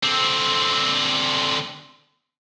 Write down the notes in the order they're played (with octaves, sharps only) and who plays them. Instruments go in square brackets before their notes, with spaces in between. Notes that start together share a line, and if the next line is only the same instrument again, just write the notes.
[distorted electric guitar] D3 C4